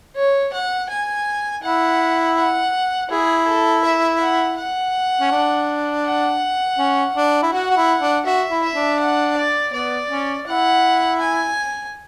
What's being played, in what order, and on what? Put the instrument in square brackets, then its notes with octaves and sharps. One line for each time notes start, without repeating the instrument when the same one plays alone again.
[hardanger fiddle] C#5
F#5
G#5
[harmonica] E4 [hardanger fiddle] F#5
[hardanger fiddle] F#5
[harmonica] E4 [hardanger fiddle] G#4
[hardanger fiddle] A4
E5
F#5
F#5
[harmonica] C#4
D4
[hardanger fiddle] F#5
[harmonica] C#4
D4
E4
[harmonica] F#4 [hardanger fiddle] F#5
[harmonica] F#4
E4
D4
[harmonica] F#4 [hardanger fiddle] E5
[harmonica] E4
[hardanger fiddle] E5
[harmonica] D4
[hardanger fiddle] F#5
D5
[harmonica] B3 [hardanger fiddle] D5
[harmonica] C#4
[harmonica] E4 [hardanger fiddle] F#5
[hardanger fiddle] G#5